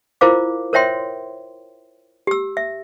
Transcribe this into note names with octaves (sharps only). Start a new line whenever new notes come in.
E4 F4 A#4 C5 F5 D6
A#4 C5 C#5 E5 G5 C6
G4 E6
E5